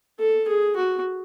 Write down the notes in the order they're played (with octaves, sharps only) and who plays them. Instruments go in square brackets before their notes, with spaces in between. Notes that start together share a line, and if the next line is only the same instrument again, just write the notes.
[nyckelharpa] A4
G#4
F#4